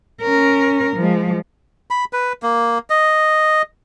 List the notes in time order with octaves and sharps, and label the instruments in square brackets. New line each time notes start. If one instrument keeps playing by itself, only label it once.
[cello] C#4 A#4
F3 G#3
[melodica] B5
B4
A#3
D#5